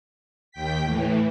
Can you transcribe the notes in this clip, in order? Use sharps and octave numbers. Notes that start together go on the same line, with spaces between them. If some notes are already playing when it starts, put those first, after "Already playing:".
D#2 G5 B6
A2 E3